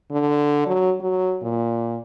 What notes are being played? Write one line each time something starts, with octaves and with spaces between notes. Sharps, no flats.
D3
F#3
F#3
A#2